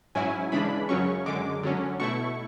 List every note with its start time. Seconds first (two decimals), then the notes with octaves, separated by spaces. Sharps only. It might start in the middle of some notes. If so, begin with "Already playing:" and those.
0.15 G#2 F#3 C#4 E4 G#5
0.52 C#3 E3 G#3 D4 B5
0.89 F#2 C#3 F#3 C#4 C#6
1.26 F#2 D3 G#3 D6
1.63 D3 F#3 C#4
2.00 B2 A3 E4 C#6